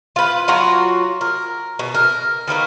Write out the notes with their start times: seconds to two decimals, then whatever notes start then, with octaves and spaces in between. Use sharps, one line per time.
0.16 F4 B4
0.48 F#3 F4 F#4 A#5
1.21 A#4
1.79 B2
1.95 A#4
2.48 D#3 A#3 B3 A#4